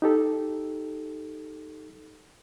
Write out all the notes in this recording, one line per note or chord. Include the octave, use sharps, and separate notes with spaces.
D#4 G4 A4